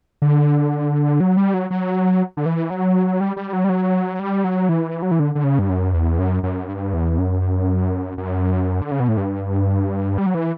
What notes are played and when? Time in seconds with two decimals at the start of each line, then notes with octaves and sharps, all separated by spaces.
0.22 D3
1.20 F#3
1.37 G3
1.54 F#3
1.71 F#3
2.37 D3
2.46 E3
2.70 F#3
3.21 G3
3.37 G3
3.53 F#3
3.64 G3
3.69 F#3
4.19 G3
4.44 F#3
4.69 E3
5.02 F#3
5.11 E3
5.20 D3
5.35 D3
5.44 C#3
5.59 G2
5.70 F#2
5.94 E2
6.19 F#2
6.43 F#2
6.68 G2
6.94 E2
7.18 F#2
8.18 F#2
8.82 D3
8.91 C#3
9.00 B2
9.08 A2
9.17 G2
10.18 G3
10.26 F#3
10.34 E3